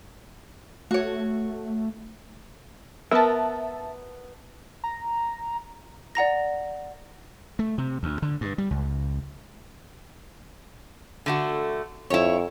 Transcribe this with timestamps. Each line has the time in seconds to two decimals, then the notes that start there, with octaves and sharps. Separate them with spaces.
0.91 A3 F#4 C#5
3.11 B3 A#4 E5 A5
4.84 A#5
6.15 D5 F#5 A#5 A#6
7.59 A3
7.78 C3
8.03 D2
8.22 D3
8.41 G2
8.58 G3
8.71 C#2
11.26 D3 A3 F#4
12.10 F2 E4 C#5